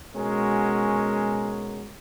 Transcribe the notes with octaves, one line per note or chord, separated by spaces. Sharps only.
B2 G#3 C#4 F#4 A#4